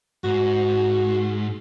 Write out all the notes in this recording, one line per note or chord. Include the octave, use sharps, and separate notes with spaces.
G#2 F#4